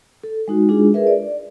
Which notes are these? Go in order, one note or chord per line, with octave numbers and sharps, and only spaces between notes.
A4
G#3 D#4 F#4
G#3 D4 F4 G#4
G#4 A#4 B4 E5
D5